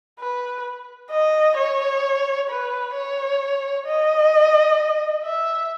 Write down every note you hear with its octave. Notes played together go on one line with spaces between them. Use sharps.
B4
D#5
C#5
B4
C#5
D#5
E5